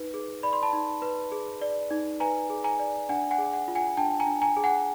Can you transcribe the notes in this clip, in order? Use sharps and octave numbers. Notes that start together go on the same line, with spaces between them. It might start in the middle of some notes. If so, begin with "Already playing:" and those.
Already playing: D#4 B4
G#4
D5 B5
C6
A5 B5
D#4
B4
G#4
D5
D#4
B4 G#5 A#5
G#4
G#5 A#5
D5
D4 F#5 G#5
F#5 G#5
G#4
F#5
F4
F#5 G#5
D4 G5 A5
G#5 A#5
D4
G#5 A#5
G#4
F#5 G#5